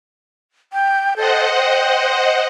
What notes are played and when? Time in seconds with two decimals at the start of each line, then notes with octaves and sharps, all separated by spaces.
0.73 G5
1.16 A4 C5 D#5 F#5
1.57 G5